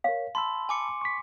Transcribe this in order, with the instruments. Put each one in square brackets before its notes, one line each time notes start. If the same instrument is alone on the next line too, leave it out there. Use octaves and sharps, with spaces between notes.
[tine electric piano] A#4 C#5 [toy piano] F5
[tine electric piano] A5 B5 E6 [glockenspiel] C6
[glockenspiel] G#5 D6 C#7
[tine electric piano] C#6 B6